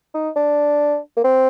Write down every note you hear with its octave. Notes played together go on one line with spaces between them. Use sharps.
D#4
D4
A#3
C4